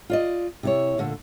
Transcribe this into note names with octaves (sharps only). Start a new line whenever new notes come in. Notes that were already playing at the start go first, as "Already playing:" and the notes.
F4 D5 D#5
C3 E4 C#5
A#2 D3 A3